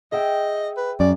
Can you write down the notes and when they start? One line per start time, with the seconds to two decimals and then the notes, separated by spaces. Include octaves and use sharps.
0.12 G#4 D#5 E5 G5
0.77 B4
1.00 F#2 D5